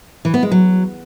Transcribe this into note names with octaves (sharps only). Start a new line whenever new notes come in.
E3
B3
G#3
F#3